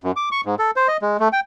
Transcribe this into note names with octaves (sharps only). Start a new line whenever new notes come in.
F#2
D6
C#6
G#2
A4
C5
D#5
G#3
A3
G5